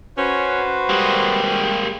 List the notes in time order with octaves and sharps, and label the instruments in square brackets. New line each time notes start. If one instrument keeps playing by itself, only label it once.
[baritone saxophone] C#4 [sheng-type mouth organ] F#4 B4 C5
[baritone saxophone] G3 [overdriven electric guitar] G#3 A#3